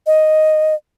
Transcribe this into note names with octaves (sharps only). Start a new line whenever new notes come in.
D#5